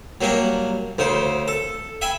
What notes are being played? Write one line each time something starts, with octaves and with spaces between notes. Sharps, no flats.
F#3 G3 A#3 D4
D2 C#3 C5
A4
E5 G5 G#5 B5